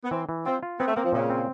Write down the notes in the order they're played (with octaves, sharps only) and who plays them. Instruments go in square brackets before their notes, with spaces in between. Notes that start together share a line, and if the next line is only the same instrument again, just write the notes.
[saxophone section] B3
[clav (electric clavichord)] E3 [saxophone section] C4
[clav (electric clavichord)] E3
[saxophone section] C4 [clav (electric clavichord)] F4
[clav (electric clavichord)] F4
[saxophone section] B3 [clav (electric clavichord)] C4
[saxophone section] A3
[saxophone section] A#3 [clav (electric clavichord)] C4
[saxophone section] F3
[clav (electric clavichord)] A#2 [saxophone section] C#3
[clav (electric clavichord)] C4